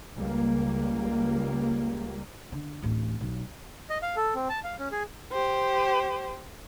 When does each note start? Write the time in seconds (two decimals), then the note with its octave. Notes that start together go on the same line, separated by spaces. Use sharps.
0.16 C#2 G3 A#3
2.52 D3
2.82 D1 A1
3.21 B1
3.90 D#5
4.02 F5
4.16 A4
4.35 C4
4.49 A5
4.64 F5
4.79 C#4
4.92 G#4
5.32 G4 C5